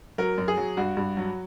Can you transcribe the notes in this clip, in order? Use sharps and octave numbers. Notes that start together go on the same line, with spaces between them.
F#3 A#4
F#2
G#4
F#3
G2 F#4
G2
F#3